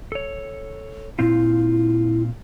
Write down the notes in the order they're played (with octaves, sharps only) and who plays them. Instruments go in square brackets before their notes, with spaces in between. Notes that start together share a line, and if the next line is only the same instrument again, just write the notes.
[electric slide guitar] A4 C#5
[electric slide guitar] A#2 C4 F4 [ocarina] E4